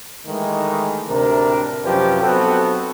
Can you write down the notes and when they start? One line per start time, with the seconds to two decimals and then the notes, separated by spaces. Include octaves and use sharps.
0.27 D#3 E3 G#3 A3
1.08 D2 A2 C3 D4 A#4
1.84 F#2 C3 F3 C#4 G4 B4
2.22 B1 B3 C4 F#4 A4